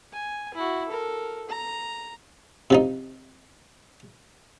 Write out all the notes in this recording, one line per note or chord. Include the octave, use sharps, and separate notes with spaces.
G#5
E4 F#4
A4 A#4
A#5
C3 F3 D#4